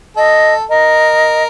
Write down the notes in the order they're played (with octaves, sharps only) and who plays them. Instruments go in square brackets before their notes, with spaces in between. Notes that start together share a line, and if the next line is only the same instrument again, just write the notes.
[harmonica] A4 [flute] D#5
[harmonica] A#4 [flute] D#5